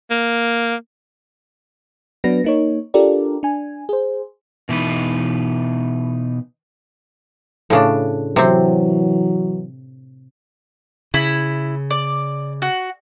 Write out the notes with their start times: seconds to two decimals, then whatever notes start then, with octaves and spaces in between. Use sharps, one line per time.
0.10 A#3
2.24 F#3 B3 D4 B4 A#6
2.44 A#3 D#4 C#5
2.94 D4 F4 G4 A4 A#4 D5
3.43 D4 G#5
3.89 G#4 C5
4.69 B2 E3 D#4 B4
7.70 A2 C#3 D4
8.36 C3 E3 F#3 C4
11.14 C#3 E4 B5
11.90 D5
12.62 F#4